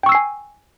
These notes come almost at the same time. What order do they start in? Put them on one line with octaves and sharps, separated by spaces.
G5 C#6 E6 C7 G#5